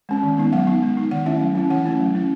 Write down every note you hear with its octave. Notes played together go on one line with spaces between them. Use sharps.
G#3 C#4
D#3
G#3 B3 D#4
F#3 F#5
B3 D#4
G#3
D#4
D#3 F#5
A3 C#4 E4 E5
F#3
C#4 E4
E3 F#5
A3 C#4 E4
F#3
C#4 E4